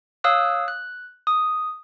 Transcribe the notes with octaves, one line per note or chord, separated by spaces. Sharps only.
C#5 F5 D#6 E6 F#6
F#6
D#6